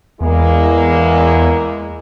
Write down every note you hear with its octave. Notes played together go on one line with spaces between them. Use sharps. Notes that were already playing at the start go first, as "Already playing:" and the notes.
E2 G#3 A#3 E4